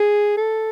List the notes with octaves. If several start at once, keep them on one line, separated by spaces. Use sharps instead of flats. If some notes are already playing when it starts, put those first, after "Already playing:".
Already playing: G#4
A4